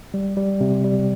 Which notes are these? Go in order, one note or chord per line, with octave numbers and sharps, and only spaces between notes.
G3
G3
C3
G3